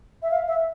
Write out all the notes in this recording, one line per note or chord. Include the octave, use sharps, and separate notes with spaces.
E5
F5
E5